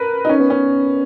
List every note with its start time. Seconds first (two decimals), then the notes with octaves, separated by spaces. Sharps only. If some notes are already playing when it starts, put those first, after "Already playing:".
Already playing: A#4 B4
0.25 D#4
0.29 C#4
0.40 B3
0.50 C#4